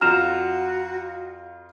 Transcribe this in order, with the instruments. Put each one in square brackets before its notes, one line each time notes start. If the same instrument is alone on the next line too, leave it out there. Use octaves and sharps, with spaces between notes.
[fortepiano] F2 F4 A#5 [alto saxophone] F#4 [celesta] F6 E7